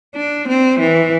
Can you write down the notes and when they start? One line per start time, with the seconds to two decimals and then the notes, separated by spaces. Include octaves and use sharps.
0.16 D4
0.48 C4
0.80 E3